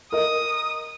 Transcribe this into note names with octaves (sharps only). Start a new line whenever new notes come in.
A#4 D#5 D#6